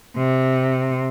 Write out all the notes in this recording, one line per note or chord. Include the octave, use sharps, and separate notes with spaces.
C3